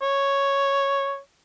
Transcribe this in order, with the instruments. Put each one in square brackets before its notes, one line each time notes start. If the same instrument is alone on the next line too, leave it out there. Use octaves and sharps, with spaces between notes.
[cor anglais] C#5